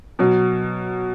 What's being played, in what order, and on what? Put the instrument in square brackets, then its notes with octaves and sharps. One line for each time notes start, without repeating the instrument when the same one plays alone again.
[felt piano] B2 F#3